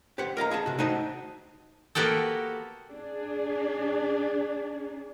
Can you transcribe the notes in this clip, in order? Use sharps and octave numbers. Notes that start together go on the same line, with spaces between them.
G4 B4 C5 F#5
A#4 D#5 F5 A#5
G#4 D#5 A5
C3 F#4
D#4 F#4 C5 D#5 G5 A5
A#3 B3 F#4 G4 A4
D4 G#4